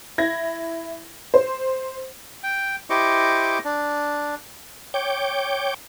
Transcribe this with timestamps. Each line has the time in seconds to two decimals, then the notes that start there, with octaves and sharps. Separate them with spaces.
0.18 E4 G#6 A#6
1.34 C5
2.43 G5
2.90 E4 G4 C5 D#5 C#6 D6
3.65 D4
4.94 C#5 G5 D6